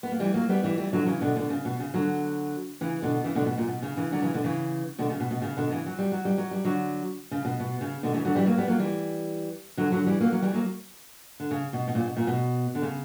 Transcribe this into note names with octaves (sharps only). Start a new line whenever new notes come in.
B3
A#3
E3 G3
F#3 A#3
G3 B3
E3 G3
E3 G3
D3 F#3
C#3 E3
B2 D3
B2 D3
C#3
B2
C#3
D3 F#3
C#3 E3
B2 D3
C#3 E3
B2 D3
B2
A#2
B2
C#3
C#3 E3
D3 F#3
C#3 E3
B2 D3
C#3 E3
B2 D3
C#3
B2
B2
C#3
B2 D3
C#3 E3
F#3
G3
F#3
G3
F#3
G3
D3 F#3
C#3
B2
B2
C#3
B2 D3
C#3 E3
D3 F#3
E3 G3
F#3 A#3
G3 B3
F#3 A#3
E3 G3
D3 F#3
D3 F#3
E3 G3
F#3 A#3
F#3 A#3
E3 G3
F#3 A#3
D3
C#3
B2
B2
A#2
B2
A#2
B2
D3
C#3